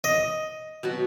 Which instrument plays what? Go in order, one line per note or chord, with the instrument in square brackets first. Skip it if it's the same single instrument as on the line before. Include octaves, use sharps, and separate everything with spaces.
[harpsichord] D#5
[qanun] B2 F#3 F#4